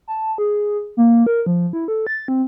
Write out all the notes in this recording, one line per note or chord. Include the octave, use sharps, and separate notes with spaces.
A5
G#4
A#3
A#4
F3
E4
A4
A6
C4